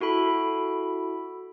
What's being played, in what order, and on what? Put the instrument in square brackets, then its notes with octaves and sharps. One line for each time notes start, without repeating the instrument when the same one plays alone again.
[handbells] E4 F#4 A4 B5